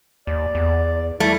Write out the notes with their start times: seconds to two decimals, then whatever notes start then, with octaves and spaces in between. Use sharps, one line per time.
0.27 D#2 D5
0.55 E2
1.20 G3 A3 E4